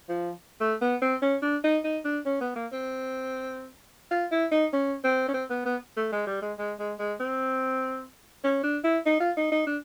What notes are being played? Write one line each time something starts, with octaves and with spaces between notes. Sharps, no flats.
F3
A3
B3
C4
C#4
D4
D#4
D#4
D4
C#4
B3
A#3
C4
F4
E4
D#4
C#4
C4
C#4
C4
B3
B3
A3
G#3
G3
G#3
G#3
G#3
G#3
C4
C#4
D4
E4
D#4
F4
D#4
D#4
D4